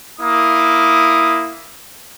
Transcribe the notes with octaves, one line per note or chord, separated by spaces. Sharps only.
A#3 E4 D#6